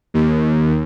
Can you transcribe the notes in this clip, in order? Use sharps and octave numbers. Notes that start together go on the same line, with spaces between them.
D#2